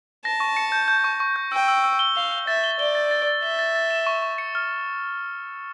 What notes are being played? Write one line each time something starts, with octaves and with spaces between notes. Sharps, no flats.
A5 A#6
C#6
C#7
G6
G6
C#6
C#6
G6
G5 E6
E6
E6
G7
F5 G7
G7
E5 A6
G7
D5 G7
A6
A6
A6
E5 G7
A6
A6
E7
C#6
C#6
C#7
F6